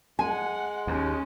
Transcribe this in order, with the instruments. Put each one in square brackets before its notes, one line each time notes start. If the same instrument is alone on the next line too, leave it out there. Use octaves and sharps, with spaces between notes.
[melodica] G#3 [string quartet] F#5 [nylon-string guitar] G#5
[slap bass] D#2 [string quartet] C#4